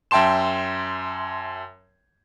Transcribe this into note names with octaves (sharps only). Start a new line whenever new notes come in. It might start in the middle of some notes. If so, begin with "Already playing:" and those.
F#2 E5 G5 A5 C6 E7